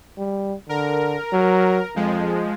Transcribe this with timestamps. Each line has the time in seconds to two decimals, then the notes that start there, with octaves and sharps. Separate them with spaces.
0.18 G3
0.69 D3 A#4
1.32 F#3
1.96 F2 F3 G#3